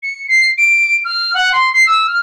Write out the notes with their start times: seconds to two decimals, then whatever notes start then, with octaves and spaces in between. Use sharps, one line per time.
0.03 C#7
0.28 C7
0.58 D7
1.04 F6
1.34 F#5
1.52 C6
1.73 C7
1.87 E6
2.07 F6